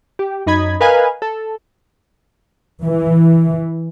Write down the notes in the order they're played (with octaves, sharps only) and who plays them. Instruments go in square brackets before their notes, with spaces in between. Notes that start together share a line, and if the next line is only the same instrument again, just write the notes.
[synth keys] G4
F#2 D#4 D#5 B5 G#6
A#4 B4 D#5 F5 G#5
A4
[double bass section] E3